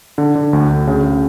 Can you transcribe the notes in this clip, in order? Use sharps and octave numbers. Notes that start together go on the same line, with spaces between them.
D3
D3
D2
D2
C#3
C#3